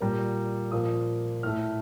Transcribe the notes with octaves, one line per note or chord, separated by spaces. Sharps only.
A#2 G3 A#3 A#5
A#2 F3 A#3 D#6
A2 A3 F6